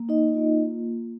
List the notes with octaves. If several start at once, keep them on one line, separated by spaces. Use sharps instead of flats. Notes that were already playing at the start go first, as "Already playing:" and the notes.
Already playing: A#3
D#4 D#5
A#3 F4